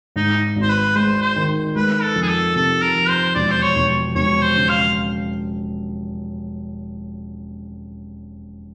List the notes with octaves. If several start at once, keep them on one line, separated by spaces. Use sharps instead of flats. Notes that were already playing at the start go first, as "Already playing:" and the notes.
G#2 D#4
G#1
C5
B4
G#3 C5
C5
D#3
G#3 B4
A4
F2
G#4
A4
C3 A4
A#4
F3
C5
E1 D5
C5
C#5
E1
E1 C#5
C5
C#3
F5